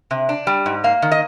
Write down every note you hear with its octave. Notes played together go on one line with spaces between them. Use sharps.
C3
D4
G3
G#2
A#3 F5
D#3
D#5